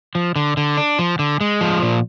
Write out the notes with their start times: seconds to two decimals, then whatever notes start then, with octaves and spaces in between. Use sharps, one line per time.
0.15 F3
0.36 D3
0.57 D3
0.77 D4
0.99 F3
1.19 D3
1.41 G#3
1.61 F3
1.82 A#2